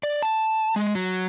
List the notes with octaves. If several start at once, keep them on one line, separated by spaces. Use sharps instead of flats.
D5
A5
G#3
F#3